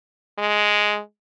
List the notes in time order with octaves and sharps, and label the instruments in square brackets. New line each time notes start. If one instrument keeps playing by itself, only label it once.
[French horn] G#3